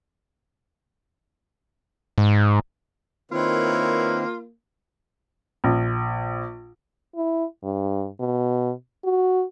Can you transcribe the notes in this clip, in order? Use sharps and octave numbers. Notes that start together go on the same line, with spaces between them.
G#2
D#3 A#3 C4 E4 F4 B4 C#5
A#1
E4
G2
B2
F#4